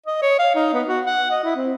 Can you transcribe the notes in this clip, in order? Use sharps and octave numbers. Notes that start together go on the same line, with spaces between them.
D#5
C#5
F5
D#4
B3
F#4
F#5
D#5
E4
C4